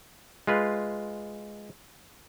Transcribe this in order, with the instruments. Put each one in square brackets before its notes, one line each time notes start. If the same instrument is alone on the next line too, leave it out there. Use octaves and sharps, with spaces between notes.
[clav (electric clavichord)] G#3 F4 B4